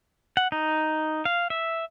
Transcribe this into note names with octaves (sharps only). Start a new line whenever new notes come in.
F#5
D#4
F5
E5